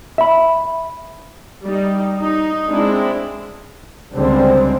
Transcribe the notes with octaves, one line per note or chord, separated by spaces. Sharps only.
E5 B5
G3 D#4
D#4
G#3 C4 D4 E4
C#2 D3 G3 G#3 C4